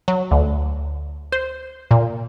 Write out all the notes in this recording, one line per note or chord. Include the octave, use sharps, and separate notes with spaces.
F#3
D2
C5
A#2